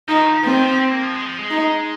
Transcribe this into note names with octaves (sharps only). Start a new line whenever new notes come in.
F3 D#4
D#3
F3
F3 C4
D#3
F3
C4
A#3
F3
G#3
F3
G#3
D#4